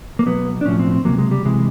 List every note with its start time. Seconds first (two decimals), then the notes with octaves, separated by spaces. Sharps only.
0.19 A#3
0.26 B1 B2 F#3 B3
0.61 D4
0.66 B1 A2 F3 C#4
0.79 C4
0.91 C4
1.05 C#2 C3 D#3 F#3 A#3
1.18 G#3
1.31 G3
1.45 C2 C3 E3 G#3